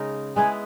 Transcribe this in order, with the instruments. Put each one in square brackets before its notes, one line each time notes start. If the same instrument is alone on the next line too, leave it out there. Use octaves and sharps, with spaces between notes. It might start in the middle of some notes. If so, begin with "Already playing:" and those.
Already playing: [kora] C#3 G#3 D#4 A#4
[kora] G#3 B3 E4 [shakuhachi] G#5